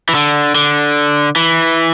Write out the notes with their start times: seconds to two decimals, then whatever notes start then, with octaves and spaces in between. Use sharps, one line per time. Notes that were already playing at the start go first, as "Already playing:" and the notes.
0.09 E3
0.15 D3
0.55 D3
1.36 E3